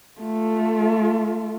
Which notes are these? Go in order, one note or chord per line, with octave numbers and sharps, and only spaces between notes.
A3 F4